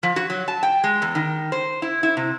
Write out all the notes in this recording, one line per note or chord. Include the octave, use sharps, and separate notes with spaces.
F3
F#4
F#3
A5
G5
G#3
E2
D#3
C5
E4
E4
C3